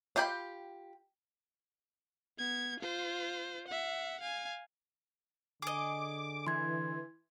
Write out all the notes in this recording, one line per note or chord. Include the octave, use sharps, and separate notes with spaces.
D4 F4 G4 G5 B5
B3 G#6
F4 C5
E5 F#5
F5 G#5
D3 G#4 D#5 D6
E3 C6 G#6